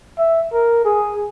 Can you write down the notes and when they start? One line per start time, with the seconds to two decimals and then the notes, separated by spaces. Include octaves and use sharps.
0.18 E5
0.53 A#4
0.85 G#4